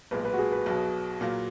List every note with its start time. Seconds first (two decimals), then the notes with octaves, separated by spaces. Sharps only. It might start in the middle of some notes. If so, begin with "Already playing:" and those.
0.11 B1 A#2 G#3 B4
0.25 B4
0.34 F#4
0.39 G#4
0.52 B4
0.66 B1 B2 F#3
1.21 A#2 F#3 A#3